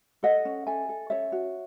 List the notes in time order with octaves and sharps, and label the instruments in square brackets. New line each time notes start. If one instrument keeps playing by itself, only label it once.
[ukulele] A4 D#5 F#5
C#4
A4 E5 G#5
A4
C#4 C#5 E5
F#4